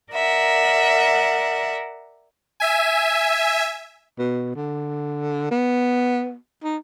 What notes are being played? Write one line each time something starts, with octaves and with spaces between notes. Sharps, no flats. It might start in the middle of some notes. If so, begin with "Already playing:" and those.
A#4 D5 E5 F#5
E5 G#5
B2
D3
B3
D#4